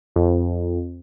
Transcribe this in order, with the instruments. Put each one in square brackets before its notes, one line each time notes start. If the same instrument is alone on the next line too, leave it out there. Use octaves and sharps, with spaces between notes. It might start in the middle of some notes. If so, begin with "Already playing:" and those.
[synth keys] F2